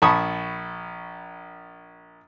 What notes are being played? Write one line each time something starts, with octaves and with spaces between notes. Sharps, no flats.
A#1 A5 B5 C#6 D#6